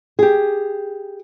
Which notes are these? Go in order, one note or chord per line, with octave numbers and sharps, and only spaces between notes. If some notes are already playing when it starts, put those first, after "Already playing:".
G4 G#4